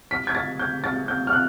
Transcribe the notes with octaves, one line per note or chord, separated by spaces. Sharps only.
B6
G#6
A6
G6
A6
G6
F6
F#6